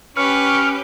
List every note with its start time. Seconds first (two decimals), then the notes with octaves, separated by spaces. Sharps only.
0.17 C#4 G4 B4 C#6 F6